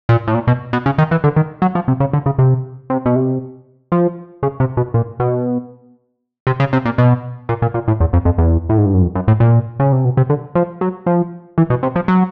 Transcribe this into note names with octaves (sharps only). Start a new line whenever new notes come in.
A#2
A2
A#2
B2
B2
C#3
D#3
E3
D3
D#3
F#3
F3
C3
C#3
D3
C#3
C3
C3
B2
C3
F3
C#3
C3
B2
A#2
B2
C3
C#3
C3
A#2
B2
A#2
A#2
A#2
A2
E2
F2
F2
E2
A2
G#2
G2
F#2
F2
F#2
A2
A#2
C#3
C3
B2
C3
D3
F3
F#3
F3
E3
B2
C3
F3
F#3